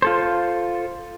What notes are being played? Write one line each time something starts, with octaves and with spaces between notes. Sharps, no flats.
F4 A4 C5